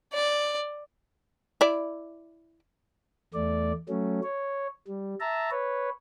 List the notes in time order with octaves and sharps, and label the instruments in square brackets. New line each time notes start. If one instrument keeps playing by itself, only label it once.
[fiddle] D5
[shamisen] E4 D5
[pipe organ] E2 A3 D5
F#3 A3 C#4
C#5
G3
E5 A5 A#5
B4 C#5